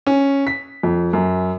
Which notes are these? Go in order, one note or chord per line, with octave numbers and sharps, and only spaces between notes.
C#4
B6
F2
F#2